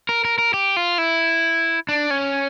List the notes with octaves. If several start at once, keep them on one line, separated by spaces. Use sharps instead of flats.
A#4
A#4
A#4
G4
F4
E4
D4
C#4